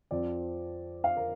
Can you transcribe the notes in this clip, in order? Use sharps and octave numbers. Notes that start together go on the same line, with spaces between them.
F2 F3 C4 D5
F5
A#4